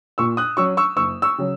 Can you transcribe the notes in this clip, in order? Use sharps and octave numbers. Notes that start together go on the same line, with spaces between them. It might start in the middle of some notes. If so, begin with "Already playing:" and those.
A#2 C#6 E6
D#6 F#6
F#3 C#4 C#6 E6
C#6 E6
F#1 C#6 E6
C#6 E6
C#3 F#3